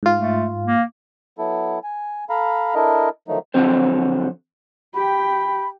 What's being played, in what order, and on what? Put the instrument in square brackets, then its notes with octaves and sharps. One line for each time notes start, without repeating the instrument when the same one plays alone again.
[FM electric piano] G#2 F4
[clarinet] A3
A#3
[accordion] F#3 B3 E4 A4
G#5
A4 F5 A#5 B5
D4 E4 A4 A#4 D#5
D3 D#3 F3 F#3 A3 D#4
[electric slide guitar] F2 D3 F3 F#3 C4 C5
[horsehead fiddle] G4 G5 [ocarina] B5